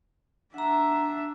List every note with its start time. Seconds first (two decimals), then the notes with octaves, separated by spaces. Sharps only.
0.54 D4 E5 F#5 A#5